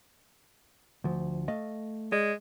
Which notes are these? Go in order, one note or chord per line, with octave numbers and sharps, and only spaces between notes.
D2 F3
A3 D#5 F5
G#3 D5